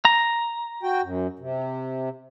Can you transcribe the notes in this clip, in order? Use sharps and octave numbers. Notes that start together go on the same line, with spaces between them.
A#5
F#4 G5
F#2
C3